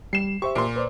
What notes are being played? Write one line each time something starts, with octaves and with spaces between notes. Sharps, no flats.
G3 C7 E7
G4 C5 E5 C#6
A#2 C6
B4 C5 D5